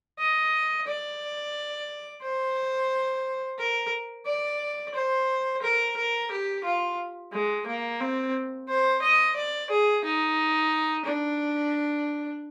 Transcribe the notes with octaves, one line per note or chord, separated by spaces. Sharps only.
D#5
D5
C5
A#4
D5
C5
A#4
A#4
G4
F4
G#3
A#3
C4
C5
D#5
D5
G#4
D#4
D4